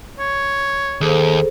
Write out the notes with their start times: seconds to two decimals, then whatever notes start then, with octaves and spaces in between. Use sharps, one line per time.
0.19 C#5
1.01 D#2 G#4 A4 C5